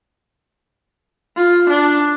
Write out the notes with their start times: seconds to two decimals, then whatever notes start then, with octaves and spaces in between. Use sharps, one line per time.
1.37 F4
1.69 D4